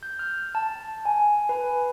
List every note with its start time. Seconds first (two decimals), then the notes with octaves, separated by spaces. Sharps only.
0.03 G6
0.19 F6
0.55 A5
1.05 G#5
1.49 B4